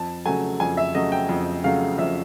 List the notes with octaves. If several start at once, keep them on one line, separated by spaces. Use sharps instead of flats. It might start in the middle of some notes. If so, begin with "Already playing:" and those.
Already playing: F2 A5
C#3 F#3 A3 G#5
F2 G#5
E5
C#3 F#3 A3 D#5
G5
F2
C#3 F#3 A3 F5
F2 E5